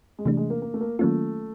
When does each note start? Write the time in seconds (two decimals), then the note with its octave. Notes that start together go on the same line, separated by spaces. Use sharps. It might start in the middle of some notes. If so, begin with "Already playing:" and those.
0.19 G#3
0.25 C3 E3 G3 A3 D4
0.37 G#3
0.50 A#3
0.62 A#3
0.74 A3
0.81 A#3
0.99 D#3 F#3 A3 A#3 C#4 F4